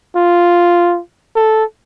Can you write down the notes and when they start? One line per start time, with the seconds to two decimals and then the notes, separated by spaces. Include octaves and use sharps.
0.16 F4
1.36 A4